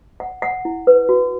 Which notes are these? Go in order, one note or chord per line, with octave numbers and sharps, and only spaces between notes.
F#5
F#5
E4
B4
F#4